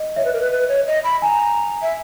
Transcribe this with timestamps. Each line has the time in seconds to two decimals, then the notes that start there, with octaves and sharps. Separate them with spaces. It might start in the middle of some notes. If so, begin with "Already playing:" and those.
Already playing: D#5
0.16 C#5 E5
0.25 B4
0.33 A#4
0.41 B4
0.52 B4
0.68 C#5
0.87 D#5
1.04 B5
1.22 G#5 A#5
1.82 E5